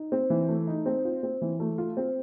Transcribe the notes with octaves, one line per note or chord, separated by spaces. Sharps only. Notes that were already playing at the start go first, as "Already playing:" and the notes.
Already playing: D#4
C4
E3
A3
D#4
C4
F4
C4
E3
A3
F4
C4